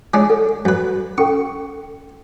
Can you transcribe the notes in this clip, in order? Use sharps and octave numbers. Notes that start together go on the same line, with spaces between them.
G#3 C#4 D4
A4
F#2 B4
C#4 A4 G5 C#6